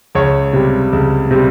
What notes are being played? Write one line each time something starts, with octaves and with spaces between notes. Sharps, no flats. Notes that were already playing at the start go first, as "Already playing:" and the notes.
C#2 C#5
C3 G3
C#2
C3 G3